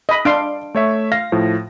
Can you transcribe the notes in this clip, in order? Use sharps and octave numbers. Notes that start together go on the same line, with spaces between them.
D#5 B5
D4 D5 F5 C6 D7
A3 C#5 E5
F5 A#6
A2 F3